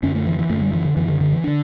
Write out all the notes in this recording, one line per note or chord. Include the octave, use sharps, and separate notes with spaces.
F#2 D3 C#4
A3
E3
E3
F#2 D3 A3
G3
E3
D3
F#2 D3 E3
D3
D3
E3
D3 D4